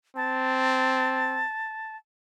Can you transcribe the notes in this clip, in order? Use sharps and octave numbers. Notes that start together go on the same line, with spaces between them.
C4 A5